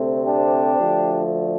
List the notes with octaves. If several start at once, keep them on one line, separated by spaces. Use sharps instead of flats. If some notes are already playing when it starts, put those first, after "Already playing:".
Already playing: D2 C3 A3 C4
D4 G4
D2 D3 F3 A3